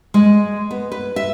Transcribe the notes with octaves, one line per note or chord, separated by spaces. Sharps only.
G#3
B3
B4
E5